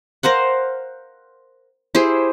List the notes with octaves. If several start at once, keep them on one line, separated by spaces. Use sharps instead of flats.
A#4 C5 F5 F#5
E4 G4 G#4 C5